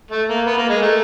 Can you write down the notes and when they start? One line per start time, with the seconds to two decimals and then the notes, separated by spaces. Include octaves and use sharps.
0.11 A3
0.29 A#3
0.46 B3
0.57 A#3
0.69 G#3
0.82 A3